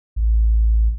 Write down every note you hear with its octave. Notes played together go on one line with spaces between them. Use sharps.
A1